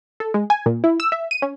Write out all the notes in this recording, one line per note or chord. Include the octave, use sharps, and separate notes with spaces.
A4
G#3
G#5
A#2
E4
E6
E5
D#7
C#4